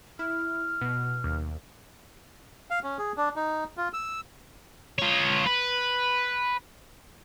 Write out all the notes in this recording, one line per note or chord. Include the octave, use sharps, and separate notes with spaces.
E4 F6
B2
D#2
F5
C#4
G#4
D4
D#4
F4
E6
F4 C#5
B4